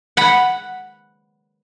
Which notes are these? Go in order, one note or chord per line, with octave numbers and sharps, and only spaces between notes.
F#5 B5